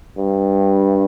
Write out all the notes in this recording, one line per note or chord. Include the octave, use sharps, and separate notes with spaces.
G2